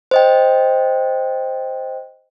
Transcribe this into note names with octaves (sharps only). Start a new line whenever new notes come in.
C5 D#5 G5